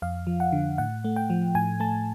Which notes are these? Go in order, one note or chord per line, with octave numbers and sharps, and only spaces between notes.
F2 F5
F3
F#5
D3
A2 F#5
A3
G5
F3
A2 G#5
A3 A5